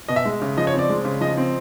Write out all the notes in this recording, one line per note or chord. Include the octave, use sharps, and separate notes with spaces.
B2 D#5
E5
G#3
C#3
F3 D#5
C#5
C4
D5
G#3
C#3
F3 D#5
C4